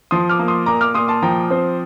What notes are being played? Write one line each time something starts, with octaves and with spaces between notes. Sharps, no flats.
F3 C6 D#6
D6 F6
A#3
C6 D#6
A#2 A#5 D6
D6 F6
A#2 C6 D#6
A5 C6
F3 G5 A#5
C4 C5